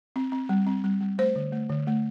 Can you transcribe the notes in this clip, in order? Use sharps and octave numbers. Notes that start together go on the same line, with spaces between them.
C4
C4
G3
C4
G3
G3
A3 C5
D3
A3
D3
A3